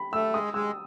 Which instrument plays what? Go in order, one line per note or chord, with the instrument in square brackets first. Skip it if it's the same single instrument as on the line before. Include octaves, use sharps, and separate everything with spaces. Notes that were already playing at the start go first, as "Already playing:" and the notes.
Already playing: [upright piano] B5
[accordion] A3 [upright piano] E6
[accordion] G#3 [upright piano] D#6
[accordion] G#3 [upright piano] E6